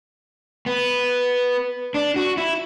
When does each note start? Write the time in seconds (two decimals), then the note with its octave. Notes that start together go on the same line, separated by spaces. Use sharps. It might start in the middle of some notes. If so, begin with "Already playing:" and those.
0.66 B3
1.94 D4
2.16 F#4
2.37 E4